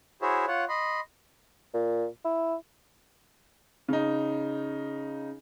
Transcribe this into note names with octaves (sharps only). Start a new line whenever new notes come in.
E4 F#4 G#4 C5 C#5 E5
F4 C#5 F#5
D#5 B5 C6
A#2
E4
C#3 D#4